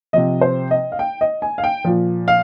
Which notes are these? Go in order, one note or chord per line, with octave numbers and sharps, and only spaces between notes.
C3 F3 D#5
C5
D#5
F5
G5
D#5
G#5
F5
G5
A#2 F3
F5